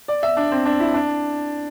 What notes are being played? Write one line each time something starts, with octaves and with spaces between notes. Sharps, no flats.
D5
E5
D4
C4
D4
E4
D4